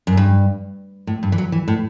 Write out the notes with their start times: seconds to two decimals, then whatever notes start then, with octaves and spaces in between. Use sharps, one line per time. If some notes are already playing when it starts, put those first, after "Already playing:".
0.07 F#2
0.17 G2
1.07 A2
1.23 G2
1.32 E3
1.38 F#3
1.52 E3
1.68 A2